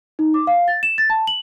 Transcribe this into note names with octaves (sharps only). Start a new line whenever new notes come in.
D#4
D6
F5
A6
E7
A6
A5
F#7